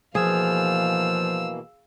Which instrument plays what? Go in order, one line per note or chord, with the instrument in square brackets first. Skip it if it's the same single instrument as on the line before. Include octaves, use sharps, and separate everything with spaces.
[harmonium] B2 E3 A#3 [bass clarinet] F3 [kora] G#4 [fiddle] F5 E6